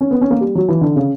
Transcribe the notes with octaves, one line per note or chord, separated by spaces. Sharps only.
C#4
B3
C#4
A#3
G3
F#3
E3
D3
C#3